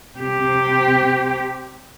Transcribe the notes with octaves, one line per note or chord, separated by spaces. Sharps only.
C3 G4